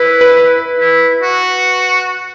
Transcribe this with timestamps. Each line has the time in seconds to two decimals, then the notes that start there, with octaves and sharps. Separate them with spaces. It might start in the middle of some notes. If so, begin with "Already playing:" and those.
Already playing: E4 B4
0.21 B4
0.79 E4
1.22 F#4